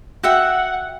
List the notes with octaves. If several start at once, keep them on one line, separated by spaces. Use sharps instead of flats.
F#4 E5 F#5 G5